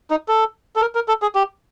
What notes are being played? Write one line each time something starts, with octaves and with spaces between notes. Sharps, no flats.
D#4
A4
A4
A#4
A#4
A4
G#4
G4